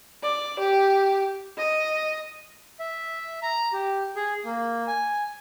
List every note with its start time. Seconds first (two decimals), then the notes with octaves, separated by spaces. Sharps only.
0.23 D5
0.59 G4
1.57 D#5
2.80 E5
3.43 A#5
3.73 G4
4.16 G#4
4.45 A#3
4.87 G#5